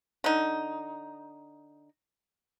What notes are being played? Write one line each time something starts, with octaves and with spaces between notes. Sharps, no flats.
D3 D#4